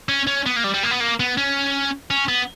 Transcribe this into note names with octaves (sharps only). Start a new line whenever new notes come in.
C#4
C#4
B3
A#3
G3
G3
A#3
B3
A#3
B3
C#4
C#4
B3